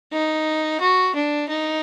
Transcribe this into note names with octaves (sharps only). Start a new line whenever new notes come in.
D#4
F#4
D4
D#4